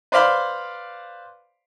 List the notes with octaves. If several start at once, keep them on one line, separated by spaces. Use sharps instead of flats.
B4 C5 D5 F5 B5 C6